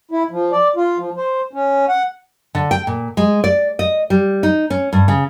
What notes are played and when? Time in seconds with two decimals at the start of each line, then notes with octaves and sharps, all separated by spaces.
0.11 E4
0.31 F3
0.52 D5
0.76 F4
0.98 F3
1.17 C5
1.53 C#4
1.88 F#5
2.55 D3
2.71 G5
2.87 A#2
3.17 G#3
3.44 D5
3.79 D#5
4.10 G3
4.43 D#4
4.70 C#4
4.93 G2
5.08 C#3